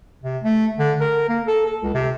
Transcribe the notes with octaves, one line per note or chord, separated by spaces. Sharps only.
C3
A3
D3
A#4
A#3
A4
A4
C#2
C3